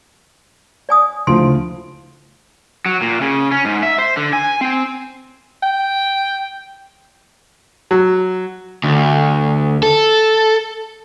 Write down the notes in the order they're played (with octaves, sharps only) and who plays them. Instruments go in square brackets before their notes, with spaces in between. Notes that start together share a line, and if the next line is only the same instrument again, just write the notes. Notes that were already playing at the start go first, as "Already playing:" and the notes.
[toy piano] D5 G#5 D#6
[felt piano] D2 E4 D7 [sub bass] C#3 [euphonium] F3 [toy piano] C6
[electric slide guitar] F#3
A#2
C#3
C#4
G#2
E5
C5
D3
G#5
C4
[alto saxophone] G5
[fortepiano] F#3
[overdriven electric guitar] D2
A4